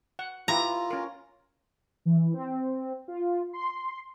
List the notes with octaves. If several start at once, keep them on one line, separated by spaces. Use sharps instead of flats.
F#5
E4 F4 G4 B4 A#5
C#4 A#4
E3
C4
F4
C6